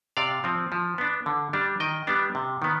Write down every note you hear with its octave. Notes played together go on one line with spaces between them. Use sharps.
C3 D5 F5
F3 C4
F3
B3 D4
D3
G3 D4
D#3 D#5 G5
G3 B3 D4
C3
D#3 B3